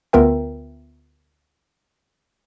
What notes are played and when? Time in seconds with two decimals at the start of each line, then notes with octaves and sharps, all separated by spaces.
0.13 D2 B3 F4 A#4 E5 G5